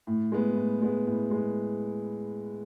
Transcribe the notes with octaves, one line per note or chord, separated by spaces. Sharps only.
A2
G#3 B3
A2
G#3 B3
A2
G#3 B3